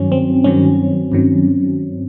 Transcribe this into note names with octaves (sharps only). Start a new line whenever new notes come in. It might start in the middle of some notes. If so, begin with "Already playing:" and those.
Already playing: G2 D#3 F#3 C#4
C4
G2 D#3 F#3 C#4
G2 D#3 F#3